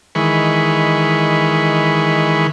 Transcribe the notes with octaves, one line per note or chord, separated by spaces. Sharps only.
D#3 E3 G#3 B5 C#6